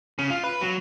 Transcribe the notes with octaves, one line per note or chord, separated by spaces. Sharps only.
C#3
F4
B4
F#3